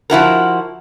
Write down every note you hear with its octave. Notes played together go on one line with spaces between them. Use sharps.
F3 E4 F#4 A#4